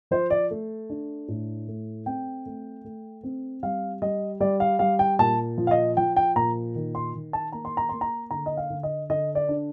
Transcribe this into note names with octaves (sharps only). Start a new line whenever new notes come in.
F3 C5
D5
A3
D4
A2
A3
C4 G5
A3
A3
C4
G3 F5
G3 D#5
G3 D5
F5
G3 F5
G5
A#2 A5
F3
F5
D#5
F3 G5
G5
A#2 A#5
D#3
C6
D#3
A5
A#3 A#5
C6
A#5
A#3 C6
A#5
D3 A#5
D#5
F5
D3
D#5
D3 D#5
D5
D4